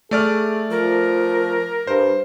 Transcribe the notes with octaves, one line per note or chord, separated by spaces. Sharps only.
A3 G#4 D5 F6
F3 A#4
G2 C5